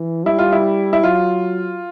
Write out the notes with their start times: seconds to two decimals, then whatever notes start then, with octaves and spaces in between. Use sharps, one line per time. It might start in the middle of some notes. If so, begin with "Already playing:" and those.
Already playing: E3
0.26 G3 E4
0.39 F4
0.52 E4
0.93 E4
1.04 F#3 F4